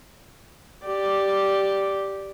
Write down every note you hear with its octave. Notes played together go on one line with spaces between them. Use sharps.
G4 D5